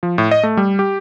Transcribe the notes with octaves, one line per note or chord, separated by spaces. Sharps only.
F3
A2
D#5
A3
G3
G4